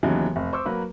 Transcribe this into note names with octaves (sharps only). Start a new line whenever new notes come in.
D#2 C#3 E3 F#3 B3 D#4
F1
C5 C#6 D6 E6
F#3 A#3 F#4 B4